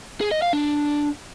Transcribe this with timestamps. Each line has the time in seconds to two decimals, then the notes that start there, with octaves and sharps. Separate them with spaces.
0.21 G#4
0.31 D#5
0.42 F5
0.53 D4